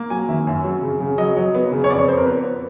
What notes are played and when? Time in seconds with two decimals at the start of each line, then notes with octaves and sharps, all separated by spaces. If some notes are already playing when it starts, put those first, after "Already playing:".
Already playing: A#3
0.10 F#3 G#5
0.29 D#3 E5
0.47 F#2
0.64 F#3
0.82 C#3
1.00 C#3
1.18 F#3 D#5
1.37 F#3
1.55 B3
1.72 C#3
1.84 C#5
1.90 F2 D5
1.99 C#5
2.08 F2 C5
2.17 A#4
2.25 B3 B4
2.43 B3